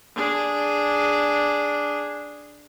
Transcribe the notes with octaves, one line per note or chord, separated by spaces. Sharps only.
D4 G#4